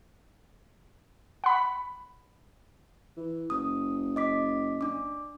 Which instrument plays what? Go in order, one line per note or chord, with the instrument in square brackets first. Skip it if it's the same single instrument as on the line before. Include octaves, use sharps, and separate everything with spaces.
[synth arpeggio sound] F#5 B5
[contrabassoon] E3
[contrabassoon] F#1 [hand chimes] D#6
[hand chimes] D#5 D6 B6
D4 D6